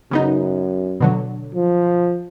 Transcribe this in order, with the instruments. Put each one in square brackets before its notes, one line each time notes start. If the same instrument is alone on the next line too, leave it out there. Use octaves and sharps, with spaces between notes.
[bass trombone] F#2 [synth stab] C#3 B3 D#4
[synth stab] B2 D3 F#3
[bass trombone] F3